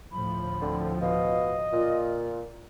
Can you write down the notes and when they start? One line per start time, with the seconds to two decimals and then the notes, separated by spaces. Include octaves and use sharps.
0.12 D2 A2 F3 B5
0.62 D3 C4
1.01 B2 D#5 F5
1.72 A#2 F4